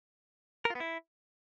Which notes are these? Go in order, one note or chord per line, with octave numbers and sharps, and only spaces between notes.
A#4
F4
B3
E4